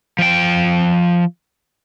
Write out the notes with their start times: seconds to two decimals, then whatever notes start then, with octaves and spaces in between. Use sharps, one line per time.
0.18 F3 G5